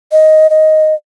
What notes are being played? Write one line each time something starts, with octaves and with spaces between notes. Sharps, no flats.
D#5
D#5